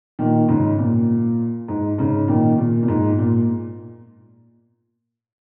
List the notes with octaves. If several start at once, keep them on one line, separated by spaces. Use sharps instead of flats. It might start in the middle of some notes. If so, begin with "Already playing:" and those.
A#2 D#3
G#2 C#3
A#2
G#2
G#2 C#3
A#2 D#3
A#2
A#2
G#2
A#2